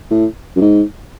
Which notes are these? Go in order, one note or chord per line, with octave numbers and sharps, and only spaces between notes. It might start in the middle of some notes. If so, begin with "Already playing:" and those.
A2
F#2
G#2